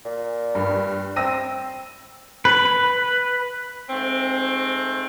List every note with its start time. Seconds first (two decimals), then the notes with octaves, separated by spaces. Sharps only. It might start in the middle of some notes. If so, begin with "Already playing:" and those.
0.05 A#2
0.55 G2
1.16 C4 E6 A#6 D#7
2.45 B4
3.89 G#2 A3 C4